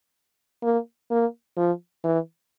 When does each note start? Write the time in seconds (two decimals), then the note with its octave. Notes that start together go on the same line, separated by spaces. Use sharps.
0.63 A#3
1.11 A#3
1.57 F3
2.04 E3